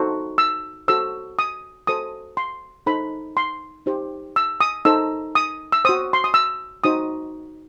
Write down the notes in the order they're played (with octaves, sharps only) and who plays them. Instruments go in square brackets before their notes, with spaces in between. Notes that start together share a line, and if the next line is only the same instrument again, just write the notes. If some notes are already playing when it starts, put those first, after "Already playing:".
Already playing: [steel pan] D#4 F#4 A4 C5
E6
F#4 A4 C5 E6
D#6
F#4 A4 C5 D#6
C6
D#4 A4 C5 B5
C6
D#4 G4 C5
E6
D#6
D#4 A4 C5 E6
D#6
E6
F#4 C5 D#6
C6
D#6
E6
D#4 F#4 C5 D#6